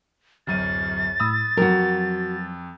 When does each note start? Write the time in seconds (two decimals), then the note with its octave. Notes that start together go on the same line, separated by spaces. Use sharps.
0.47 D1 F#2 A6 D#7
1.20 A2 B5 D#6 E6
1.57 F2 F#3 F#4 A#4